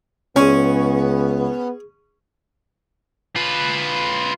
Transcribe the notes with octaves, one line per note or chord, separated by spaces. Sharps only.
C#2 B3 C#4 G#4 C6 C#6
F4 B4